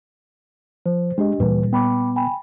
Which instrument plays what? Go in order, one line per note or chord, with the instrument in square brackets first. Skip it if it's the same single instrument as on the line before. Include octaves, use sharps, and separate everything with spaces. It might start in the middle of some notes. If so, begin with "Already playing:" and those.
[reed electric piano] F3 [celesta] C5
[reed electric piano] G#3 [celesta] D4 G4 D#5
[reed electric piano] D2 E3 [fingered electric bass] A#2 G3 [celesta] B4
[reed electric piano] B3 [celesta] G5 B5 D6
[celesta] G5 G#5 B5